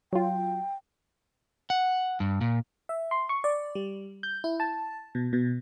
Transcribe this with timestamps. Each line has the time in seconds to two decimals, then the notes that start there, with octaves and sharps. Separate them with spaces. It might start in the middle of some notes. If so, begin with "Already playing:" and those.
0.13 F#3 F4 G5
1.70 F#5
2.20 G2
2.41 A#2
2.89 E5
3.11 C6
3.29 C#6
3.44 D5
3.75 G3
4.23 G6
4.44 E4
4.60 A5
5.15 B2
5.33 B2